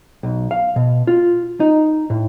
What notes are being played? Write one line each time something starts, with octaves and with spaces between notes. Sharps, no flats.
B1
F5
B2
F4
D#4
A2